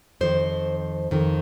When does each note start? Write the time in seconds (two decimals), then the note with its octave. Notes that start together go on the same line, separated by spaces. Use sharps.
0.21 F2 D#3 C5
1.11 F2 D#3